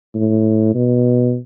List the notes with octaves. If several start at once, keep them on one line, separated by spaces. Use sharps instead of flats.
A2
B2